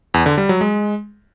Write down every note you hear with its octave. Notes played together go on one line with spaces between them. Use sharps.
E2
D3
G3
F#3
G#3